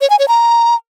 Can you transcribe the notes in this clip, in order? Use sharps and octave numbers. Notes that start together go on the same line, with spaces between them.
C#5
G#5
C#5
A#5